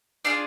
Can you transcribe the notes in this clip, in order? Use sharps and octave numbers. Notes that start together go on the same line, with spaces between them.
D4 F4 G#4 D5